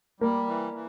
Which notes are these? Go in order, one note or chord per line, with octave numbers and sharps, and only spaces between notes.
G3 A#3
E3
E3